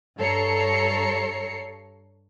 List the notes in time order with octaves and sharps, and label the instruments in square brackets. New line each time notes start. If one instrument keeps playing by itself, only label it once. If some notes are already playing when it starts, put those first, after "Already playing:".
[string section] G2 A4 C#5 A#5 C7 C#7